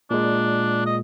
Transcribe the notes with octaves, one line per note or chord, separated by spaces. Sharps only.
A#2 G#3 D4
D#5